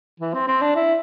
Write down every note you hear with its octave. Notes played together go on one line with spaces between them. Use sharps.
E3
C4
C4
D4
E4